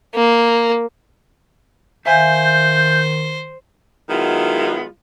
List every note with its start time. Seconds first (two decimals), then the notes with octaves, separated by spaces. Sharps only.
0.15 A#3
2.06 D#3 C5 E5 F5 G#5 G6
4.10 D#3 F#3 G#3 B3 E4 F4